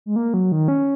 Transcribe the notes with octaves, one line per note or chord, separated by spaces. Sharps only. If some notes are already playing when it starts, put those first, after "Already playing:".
G#3
A#3
F#3
D#3
C#4